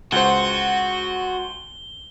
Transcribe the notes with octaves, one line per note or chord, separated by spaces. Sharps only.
C#2 F#4 C5 G7